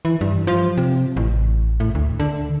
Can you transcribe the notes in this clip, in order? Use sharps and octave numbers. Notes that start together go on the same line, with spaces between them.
E3
G2
F3
C3
A1
A2
D2
D3